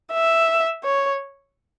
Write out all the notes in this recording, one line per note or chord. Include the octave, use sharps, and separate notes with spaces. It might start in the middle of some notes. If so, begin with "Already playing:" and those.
E5
C#5